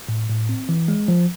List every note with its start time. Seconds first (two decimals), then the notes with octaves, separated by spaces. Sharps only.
0.08 A2
0.29 A2
0.49 C4
0.69 E3
0.88 G#3
1.08 F3